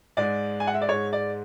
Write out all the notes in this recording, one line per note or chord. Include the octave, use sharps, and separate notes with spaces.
G#2 G#3 D5
G#5
F#5
E5
D5
G#2 G#3 C#5
D5